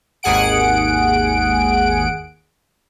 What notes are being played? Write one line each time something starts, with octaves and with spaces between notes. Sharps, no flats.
G#1 D#2 G#4 F#5 D7